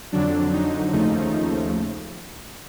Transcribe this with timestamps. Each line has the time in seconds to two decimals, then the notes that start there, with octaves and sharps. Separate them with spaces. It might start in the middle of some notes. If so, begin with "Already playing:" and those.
0.12 F2 D3 F#3 D4
0.53 D#4
0.93 D#2 C#3 F3 A3 D#4